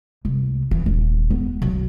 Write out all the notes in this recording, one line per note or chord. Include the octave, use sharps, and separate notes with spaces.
C2
E3
D#1
B3
B1